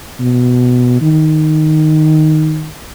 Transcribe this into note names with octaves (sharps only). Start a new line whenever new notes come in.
B2
D#3